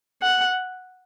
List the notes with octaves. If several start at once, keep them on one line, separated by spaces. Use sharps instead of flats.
F#5